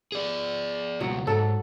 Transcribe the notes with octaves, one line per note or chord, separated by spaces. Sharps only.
G#4 D5
C#2 B2 F#3
G#2 F#3 A4